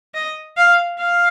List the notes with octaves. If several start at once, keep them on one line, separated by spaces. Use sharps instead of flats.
D#5
F5
F5